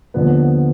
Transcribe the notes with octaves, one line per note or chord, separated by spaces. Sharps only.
D#2 D3 F3 B3